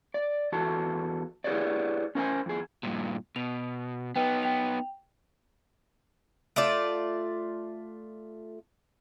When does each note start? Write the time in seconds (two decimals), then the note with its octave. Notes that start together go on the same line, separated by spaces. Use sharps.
0.14 D5
0.52 E2 F#4 A4 A5
1.44 E4 G4 G#4 B4 C#5 D5
2.15 C#4 A#4 C5 G#5
2.46 F2 G#4
2.83 G2 A#2
3.36 B2 F7
4.16 B3 D#4 B4 G5
4.43 G5 F7
6.56 A3 F4 D5